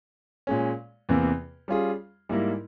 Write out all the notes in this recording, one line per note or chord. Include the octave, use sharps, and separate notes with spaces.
A#2 G#3 C#4
E2 C3 E3 A#3
G3 C#4 F4 G#4
G#2 G3 A#3 E4 A#4